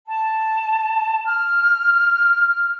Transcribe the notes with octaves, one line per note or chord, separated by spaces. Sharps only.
A5
F6